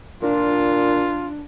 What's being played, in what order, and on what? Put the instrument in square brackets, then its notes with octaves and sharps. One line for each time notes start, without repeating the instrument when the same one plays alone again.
[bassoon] A#2 [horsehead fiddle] D4 [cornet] F4